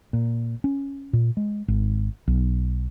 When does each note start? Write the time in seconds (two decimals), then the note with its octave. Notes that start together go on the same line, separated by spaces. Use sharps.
0.13 A#2
0.64 C#4
1.13 A#2
1.37 G#3
1.68 G#1
2.28 B1